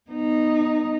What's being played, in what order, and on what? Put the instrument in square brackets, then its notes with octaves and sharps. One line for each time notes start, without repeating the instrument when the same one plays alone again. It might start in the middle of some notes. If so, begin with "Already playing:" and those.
[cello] B3 D#4